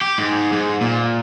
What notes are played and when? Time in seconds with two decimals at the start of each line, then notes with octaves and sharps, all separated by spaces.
0.01 G4
0.18 G#2
0.52 G#2
0.81 A#2